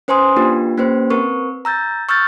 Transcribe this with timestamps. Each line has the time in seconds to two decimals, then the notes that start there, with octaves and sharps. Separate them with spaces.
0.08 C#4 B4 C5 G#5 C6 D#6
0.36 A#3 D4 F4 G4 B4
0.78 A#3 C#4 G4 B4 C5
1.10 C4 A#4 B4 C#6
1.65 A#5 E6 G6 A6
2.09 C#6 E6 F6 G6 A6